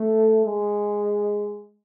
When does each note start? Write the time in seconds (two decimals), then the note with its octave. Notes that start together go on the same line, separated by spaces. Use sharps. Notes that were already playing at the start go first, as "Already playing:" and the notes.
Already playing: A3
0.46 G#3